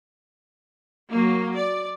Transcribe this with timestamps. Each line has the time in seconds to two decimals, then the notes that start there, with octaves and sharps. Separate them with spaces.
1.09 F#3 A#3
1.54 D5